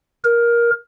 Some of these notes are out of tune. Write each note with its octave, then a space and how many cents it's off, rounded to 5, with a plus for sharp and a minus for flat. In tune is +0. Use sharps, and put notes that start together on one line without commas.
A#4 +15